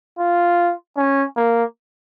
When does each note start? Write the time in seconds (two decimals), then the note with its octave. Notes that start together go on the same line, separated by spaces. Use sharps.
0.19 F4
0.97 C#4
1.37 A#3